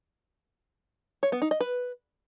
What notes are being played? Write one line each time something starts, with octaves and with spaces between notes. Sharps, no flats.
C#5
B3
D#4
D#5
B4